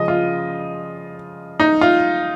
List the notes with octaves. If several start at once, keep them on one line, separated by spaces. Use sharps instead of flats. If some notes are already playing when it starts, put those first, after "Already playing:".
Already playing: C#3 F3 G#3 D#5
F4
D#4
F4